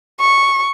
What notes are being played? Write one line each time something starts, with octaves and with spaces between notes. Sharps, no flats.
C#6